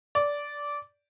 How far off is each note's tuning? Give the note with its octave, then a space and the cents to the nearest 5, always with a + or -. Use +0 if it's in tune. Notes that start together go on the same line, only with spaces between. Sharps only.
D5 -15